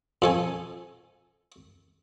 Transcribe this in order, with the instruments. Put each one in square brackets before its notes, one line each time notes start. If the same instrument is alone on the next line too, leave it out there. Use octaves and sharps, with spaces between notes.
[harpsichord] F2 A4 G#5